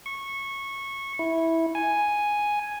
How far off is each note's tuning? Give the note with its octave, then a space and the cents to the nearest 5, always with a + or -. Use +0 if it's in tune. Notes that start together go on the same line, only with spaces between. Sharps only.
C#6 -15
E4 -10
G#5 +0